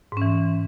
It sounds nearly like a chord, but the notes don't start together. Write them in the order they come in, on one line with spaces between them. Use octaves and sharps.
G#2 C#4 E3